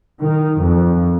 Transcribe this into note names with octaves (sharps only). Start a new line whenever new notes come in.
D#3
F2